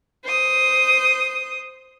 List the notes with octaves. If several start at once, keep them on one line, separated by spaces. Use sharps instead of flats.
C5 D#6